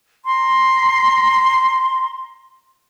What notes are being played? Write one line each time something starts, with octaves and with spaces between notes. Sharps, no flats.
A#5 C6